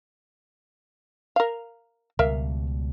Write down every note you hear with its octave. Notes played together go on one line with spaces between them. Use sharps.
A#4 F5
C#2 B2 G3 A#4 E5 F5